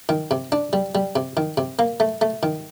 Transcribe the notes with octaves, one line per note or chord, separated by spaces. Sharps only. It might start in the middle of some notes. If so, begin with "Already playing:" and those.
D#3
C3
D4
G3
G3
C3
D#3
C3
A#3
A3
A3
D#3